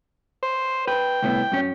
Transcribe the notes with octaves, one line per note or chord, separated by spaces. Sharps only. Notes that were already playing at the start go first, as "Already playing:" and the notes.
C5
B4 G5
C2 A2 B3
F#2 C#4